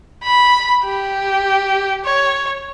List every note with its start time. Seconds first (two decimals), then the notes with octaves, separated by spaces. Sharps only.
0.23 B5
0.84 G4
2.05 C#5